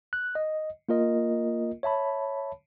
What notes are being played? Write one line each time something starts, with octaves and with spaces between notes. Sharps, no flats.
F#6
D#5
A#3 F4 A#4 D#5
C#5 E5 A5 B5